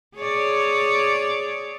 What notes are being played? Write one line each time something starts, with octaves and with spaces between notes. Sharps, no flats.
G#4 C#5 D5